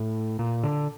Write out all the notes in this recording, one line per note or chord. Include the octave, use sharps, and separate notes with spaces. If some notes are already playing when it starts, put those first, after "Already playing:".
Already playing: A2
A#2
D3